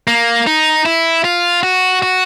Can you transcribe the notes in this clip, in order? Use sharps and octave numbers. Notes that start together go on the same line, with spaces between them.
A#3
D#4
E4
F4
F#4
F#4